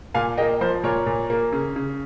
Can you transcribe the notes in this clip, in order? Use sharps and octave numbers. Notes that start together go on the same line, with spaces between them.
A#2 F5 G#5
A#3 D#5 G5
F3 C5
A#2 A#4 C#5
A#2
A#3
C#3
C#3